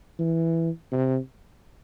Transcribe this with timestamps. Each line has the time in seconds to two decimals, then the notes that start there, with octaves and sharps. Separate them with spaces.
0.19 E3
0.92 C3